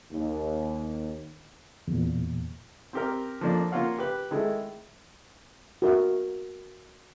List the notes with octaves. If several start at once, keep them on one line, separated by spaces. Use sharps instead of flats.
D#2
E2 A#2
C4 G4 A#4
F3 A3 A#3 D4 D5
A#3 F4 C#5 F5 F#5
G4 B4
D#3 G#3 A3 E4
F#4 A#4 E5